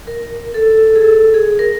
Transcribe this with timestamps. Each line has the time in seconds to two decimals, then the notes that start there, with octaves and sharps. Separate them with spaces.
0.07 A#4
0.54 A4
0.96 G#4
1.02 A4
1.34 G#4
1.59 A#4